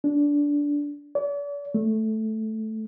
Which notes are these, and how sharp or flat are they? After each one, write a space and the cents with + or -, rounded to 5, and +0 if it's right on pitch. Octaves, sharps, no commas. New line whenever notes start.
D4 -15
D5 -45
A3 -5